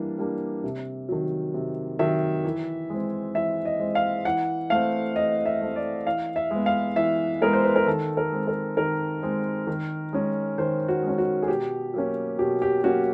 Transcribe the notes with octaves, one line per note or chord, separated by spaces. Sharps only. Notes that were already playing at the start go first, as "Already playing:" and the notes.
Already playing: E3 G3 A#3 D4
G3 A#3 D4
C3
D#3 F#3
C3
D#3 F#3 E5
E3
G#3 C4
E3 E5
D#5
G#3 C4
F5
E3 F#5
A3 C4 F5
E3 D#5
E5
A3 C4
D5
E3 F5
E5
G#3 B3
F5
E3 E5
G#3 B3 A#4
C5
B4
A#4
D#3 A4
A#4
G#3 C4
A#4
D#3 A#4
G#3 C4
D#3
G#3 C#4
D#3 C5
F#4
G#3 C#4
F#4
G#4
B2 G4
F#3 A#3 C#4
B2 G4
G4
F#3 A#3 C#4 F#4